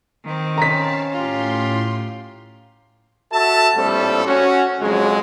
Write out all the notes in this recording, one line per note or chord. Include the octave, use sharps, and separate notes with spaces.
D#3 C4
C#4 F5 A5 A#5 B6
A2 F4 G4 C6
F#4 A4 E5 A5
A#1 A2 G3 A3 C4 A4
C#4 F#4
F2 C#3 F#3 G#3